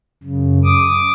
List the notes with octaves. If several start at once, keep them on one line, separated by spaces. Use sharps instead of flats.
F#2 C#3
D6 D#6